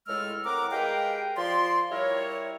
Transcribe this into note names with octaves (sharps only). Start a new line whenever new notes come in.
C#2 A2 G#3 A4 E6 F6
A2 C4 A#4 F#5 A#5 D6
G#3 G4 A#4 B4 F5 G5
F3 D5 C6
G3 E4 A#4 C#5